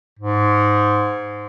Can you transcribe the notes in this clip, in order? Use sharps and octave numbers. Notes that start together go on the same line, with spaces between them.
G#2